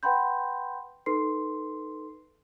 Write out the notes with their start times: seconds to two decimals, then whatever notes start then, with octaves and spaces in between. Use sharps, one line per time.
0.03 B4 F#5 G5 B5 C6 G6
1.06 D#4 A4 B4 C6 C7